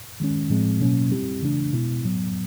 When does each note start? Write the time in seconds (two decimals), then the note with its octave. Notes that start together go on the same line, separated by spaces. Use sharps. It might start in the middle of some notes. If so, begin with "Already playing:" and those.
0.20 D#3 G#3 C#4
0.50 A2 F3 G#3 C4
0.80 B2 F#3 A#3 C#4
1.11 G3 C4 E4 G4
1.42 C#3 E3 A3 D4
1.72 B2 G#3 B3 E4
2.02 A2 F#3 B3